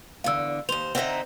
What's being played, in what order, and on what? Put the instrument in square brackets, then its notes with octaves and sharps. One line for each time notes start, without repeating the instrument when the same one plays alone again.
[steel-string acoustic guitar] E2 D3 [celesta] F5 E6
[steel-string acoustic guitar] D#2 C5 [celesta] F7
[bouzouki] D3 E5 A#5 [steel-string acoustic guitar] C4 D#4